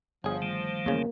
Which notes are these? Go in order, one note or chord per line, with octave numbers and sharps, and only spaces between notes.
G1 F3 G#4 C#5
D#3 G3 A3
E2 C#3 A#3